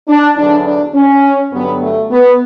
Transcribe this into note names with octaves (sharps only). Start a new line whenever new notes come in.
D4
E2 D3 F#3 D4
D4
C#4
G2 D3 F#3 B3
A3
B3